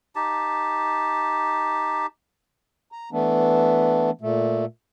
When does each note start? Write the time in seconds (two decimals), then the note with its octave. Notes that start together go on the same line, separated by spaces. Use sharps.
0.15 D#4 G4 A5
2.92 A#5
3.12 E3 A3 B3 D4
4.21 A#2 A3